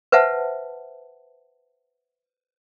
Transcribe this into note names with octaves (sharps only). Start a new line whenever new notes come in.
B4 C5 E5 F#5 A5